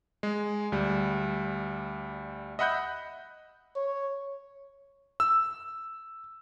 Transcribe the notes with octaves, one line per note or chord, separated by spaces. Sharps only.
G#3
D2 G3
D#5 E5 F#5 B5 F#6 G6
C#5
E6